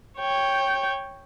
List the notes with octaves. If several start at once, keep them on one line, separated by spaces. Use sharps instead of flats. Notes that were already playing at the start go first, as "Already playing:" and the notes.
C#5 G5